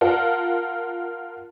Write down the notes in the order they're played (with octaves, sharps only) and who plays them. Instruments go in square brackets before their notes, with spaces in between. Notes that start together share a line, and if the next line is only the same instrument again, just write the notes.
[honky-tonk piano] F4 A#4 F#5 A5